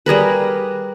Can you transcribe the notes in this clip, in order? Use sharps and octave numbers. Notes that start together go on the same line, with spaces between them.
G3 G#4 A#4 B4